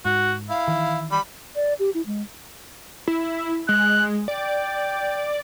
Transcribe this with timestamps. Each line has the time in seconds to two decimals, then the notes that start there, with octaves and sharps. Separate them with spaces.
0.05 G#2 F#4
0.49 E4 F5
0.68 D#3 E3
1.11 G3 B5
1.56 D5
1.79 G4
1.94 E4
2.06 G#3
3.08 E4
3.69 G#3 F#6
4.28 D5 G5